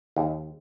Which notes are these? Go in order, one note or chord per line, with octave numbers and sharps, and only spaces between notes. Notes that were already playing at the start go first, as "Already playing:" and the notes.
D#2